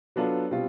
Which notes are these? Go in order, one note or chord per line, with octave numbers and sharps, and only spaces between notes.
F#3 B3 D4 F4 A4
B2 G3 C4 F4